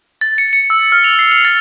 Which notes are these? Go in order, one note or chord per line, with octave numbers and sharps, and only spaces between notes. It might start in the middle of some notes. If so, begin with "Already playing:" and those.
A6
C#7
C#7
E6
F6
F7
C7
F7
A6